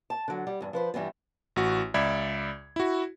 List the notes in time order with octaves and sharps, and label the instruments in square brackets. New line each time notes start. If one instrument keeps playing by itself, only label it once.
[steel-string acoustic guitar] A5
D3 F#3
G3
E2 G2
F3 B4 C5
G2 E3 G3 B3
[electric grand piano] A1 F#4
C#2 D5 E5 B5 G#6
E4 F#4